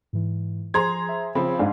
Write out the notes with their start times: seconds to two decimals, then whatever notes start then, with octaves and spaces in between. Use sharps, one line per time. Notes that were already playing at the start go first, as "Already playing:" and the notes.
0.13 G#2 E3
0.74 F3 G#4 C5 A#5 C6 G#6
1.09 E5
1.35 C#3 F3 C4 B5
1.59 G#2 D4 F5 G#5